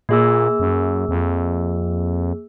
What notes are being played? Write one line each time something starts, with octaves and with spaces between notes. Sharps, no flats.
A#2 A#3 G#4 E6
F#2
F2